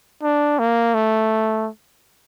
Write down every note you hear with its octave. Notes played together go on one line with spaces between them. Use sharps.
D4
A#3
A3